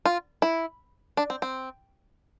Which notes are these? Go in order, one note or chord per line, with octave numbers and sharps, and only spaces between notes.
F4
E4
D4
C4
C4